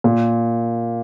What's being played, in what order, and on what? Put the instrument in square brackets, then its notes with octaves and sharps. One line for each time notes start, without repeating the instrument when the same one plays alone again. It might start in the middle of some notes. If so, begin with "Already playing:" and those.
[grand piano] A#2